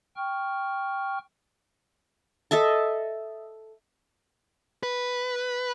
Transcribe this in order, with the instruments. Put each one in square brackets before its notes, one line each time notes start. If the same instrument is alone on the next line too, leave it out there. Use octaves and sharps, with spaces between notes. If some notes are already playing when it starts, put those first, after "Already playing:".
[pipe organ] G5 C#6 F6
[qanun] A4 D#5 E5 A5
[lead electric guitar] B4